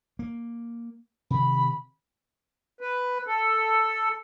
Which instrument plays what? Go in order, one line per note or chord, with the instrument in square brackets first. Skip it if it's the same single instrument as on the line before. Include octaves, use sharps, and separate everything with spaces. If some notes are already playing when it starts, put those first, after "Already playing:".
[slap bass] A#3
[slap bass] C3 D#3 [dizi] B5
[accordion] B4
A4